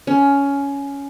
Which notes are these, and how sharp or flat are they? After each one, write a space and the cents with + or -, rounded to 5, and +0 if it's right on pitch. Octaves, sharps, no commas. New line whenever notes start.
C#4 +15